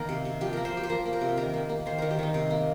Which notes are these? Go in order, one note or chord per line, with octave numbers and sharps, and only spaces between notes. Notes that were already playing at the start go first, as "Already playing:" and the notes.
Already playing: D#3 A#3 A#4
C3
C3
F3 G4
A#3 A#4
C5
F3 G4
C5
F3 A#4
A#3
A#4
C3
G4
D#3 A#4
A#3
A#3
D#3 C5
D#3 A#4
G4
D#3 D#4
C3
A#3